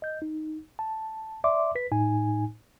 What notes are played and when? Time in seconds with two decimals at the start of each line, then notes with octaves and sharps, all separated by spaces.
0.02 D#5 G6
0.22 D#4
0.79 A5
1.44 D5 E5 C6 D6
1.75 B4 B6
1.92 A2 D#4 G#5